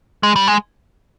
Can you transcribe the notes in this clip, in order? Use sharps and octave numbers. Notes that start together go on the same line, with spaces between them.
G#3
G3
G#3